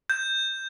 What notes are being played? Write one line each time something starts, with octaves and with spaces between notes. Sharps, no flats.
G6